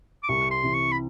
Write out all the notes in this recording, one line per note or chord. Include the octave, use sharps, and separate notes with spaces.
D6
C2 C#6
C6
C3 E3
C#6
B5